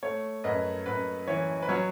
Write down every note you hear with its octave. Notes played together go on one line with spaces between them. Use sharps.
A3 C#5
F#2 B4 D#5
F#2 B4
E3 C#5
B4
F#3 C#5